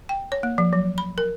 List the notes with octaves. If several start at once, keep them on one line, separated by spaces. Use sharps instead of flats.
G5
C#5
A#3
F3
F#3
B5
A#4